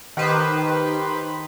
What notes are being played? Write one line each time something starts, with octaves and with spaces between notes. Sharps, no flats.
D#3 G4 B4 C5